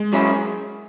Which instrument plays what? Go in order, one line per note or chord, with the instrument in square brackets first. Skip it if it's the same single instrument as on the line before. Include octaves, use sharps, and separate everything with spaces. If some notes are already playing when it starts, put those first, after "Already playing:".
Already playing: [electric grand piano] G#3
[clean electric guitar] F#3 C#4 E4